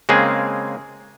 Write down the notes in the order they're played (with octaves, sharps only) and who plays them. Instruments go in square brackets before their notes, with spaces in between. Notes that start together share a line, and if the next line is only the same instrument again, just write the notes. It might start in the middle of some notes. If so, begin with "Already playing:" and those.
[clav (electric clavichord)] C#3 G#3 A#3 C4 G#4